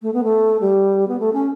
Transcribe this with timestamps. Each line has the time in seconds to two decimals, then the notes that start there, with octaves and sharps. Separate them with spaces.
0.02 A3
0.13 B3
0.23 A3
0.60 G3
1.07 B3
1.19 A3
1.33 C#4